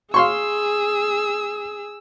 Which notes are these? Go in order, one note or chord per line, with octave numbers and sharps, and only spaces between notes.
G#4 F5 C6 C#6 E6